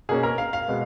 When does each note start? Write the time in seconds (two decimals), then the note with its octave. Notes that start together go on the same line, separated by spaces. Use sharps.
0.09 B2 A#3 C#4 G#4
0.23 A#4
0.38 F5
0.53 F5
0.68 B2 G#3 B3